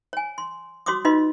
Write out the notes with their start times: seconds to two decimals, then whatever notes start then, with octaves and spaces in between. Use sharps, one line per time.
0.13 C#5 G#5
0.38 C6
0.86 F#4 C#5 C6 D6 D#6
1.05 D#4 F4 F#4 B4 D#5 C6